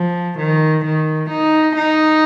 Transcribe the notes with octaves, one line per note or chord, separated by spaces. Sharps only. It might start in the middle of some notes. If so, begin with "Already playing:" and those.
Already playing: F3
D#3
D#3
D#4
D#4